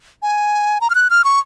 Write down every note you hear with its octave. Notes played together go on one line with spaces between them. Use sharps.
G#5
A#5
F6
F#6
F6
C#6